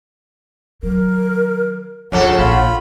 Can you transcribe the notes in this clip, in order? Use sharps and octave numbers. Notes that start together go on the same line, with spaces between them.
D#3 F#3 A#4
D2 G#2 C#3 F3 A4 F#5
A#1 F4 B5